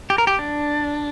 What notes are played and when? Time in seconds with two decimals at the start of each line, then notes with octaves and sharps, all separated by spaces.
0.10 G4
0.18 A#4
0.27 G4
0.39 D4